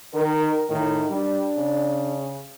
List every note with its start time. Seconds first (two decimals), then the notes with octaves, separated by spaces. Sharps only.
0.14 D#3 A#4
0.69 A2 D#3
1.09 G3 D4
1.57 C#3